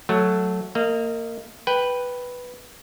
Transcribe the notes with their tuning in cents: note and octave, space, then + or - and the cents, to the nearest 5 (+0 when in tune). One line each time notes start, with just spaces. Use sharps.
F#3 +0 A3 +0
A#3 -25 D#5 +10
B4 +0 G5 +5